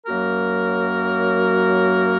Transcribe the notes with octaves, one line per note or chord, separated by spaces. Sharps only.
F#2 F#3 A#3 F#4 A#4